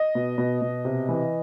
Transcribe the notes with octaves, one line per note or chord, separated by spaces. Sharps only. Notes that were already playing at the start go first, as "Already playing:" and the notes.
Already playing: D#5
B2
B2
B2
C3
E3